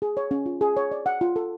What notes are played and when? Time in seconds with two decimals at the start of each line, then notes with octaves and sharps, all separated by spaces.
0.02 G#4
0.17 C#5
0.31 C#4
0.46 F4
0.61 G#4
0.77 C#5
0.91 D5
1.06 F#5
1.21 F4
1.36 A4